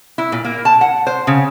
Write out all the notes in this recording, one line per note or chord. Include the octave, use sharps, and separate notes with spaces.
E4
A#2
A#3
A5
F#5
C5
C#3